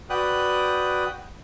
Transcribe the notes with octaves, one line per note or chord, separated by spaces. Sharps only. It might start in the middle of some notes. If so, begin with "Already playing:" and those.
F#4 B4 D5 G5 D#6 F#6